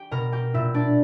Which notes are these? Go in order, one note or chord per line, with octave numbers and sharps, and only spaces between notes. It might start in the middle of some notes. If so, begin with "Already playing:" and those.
Already playing: G4 G5
B2 A#4 A#5
G4 G5
A#2 E4 E5
D4 D5